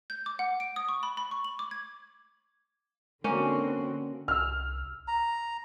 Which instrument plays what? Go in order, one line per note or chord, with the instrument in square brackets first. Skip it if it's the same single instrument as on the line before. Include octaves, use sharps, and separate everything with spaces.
[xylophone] G6
D6
F#5
D7
D#6
C#6
B5
B5
C#6
F#7
D6
G#6
[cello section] D3 C4 F#4 [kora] A#3 C#4
[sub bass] C2 [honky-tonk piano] E6 F6
[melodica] A#5